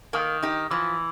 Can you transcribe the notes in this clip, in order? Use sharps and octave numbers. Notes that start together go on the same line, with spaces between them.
D#3 A#3
D#4 G4
E3 F3